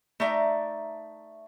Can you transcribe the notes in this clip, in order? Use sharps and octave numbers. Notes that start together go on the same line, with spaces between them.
A3 D#4 D5 E5 A#5